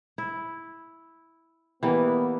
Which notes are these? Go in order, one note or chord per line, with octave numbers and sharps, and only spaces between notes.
E4
E3 G3 A#3 B3